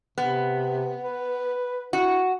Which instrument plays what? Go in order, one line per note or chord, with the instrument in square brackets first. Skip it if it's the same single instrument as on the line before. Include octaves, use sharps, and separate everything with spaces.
[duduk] C3 [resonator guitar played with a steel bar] B3
[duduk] B4
[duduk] E4 [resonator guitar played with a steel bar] F#4